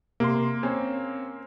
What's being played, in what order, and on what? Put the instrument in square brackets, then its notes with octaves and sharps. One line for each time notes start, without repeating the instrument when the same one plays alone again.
[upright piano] C3 C6 [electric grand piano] A#3
[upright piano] C4 C#4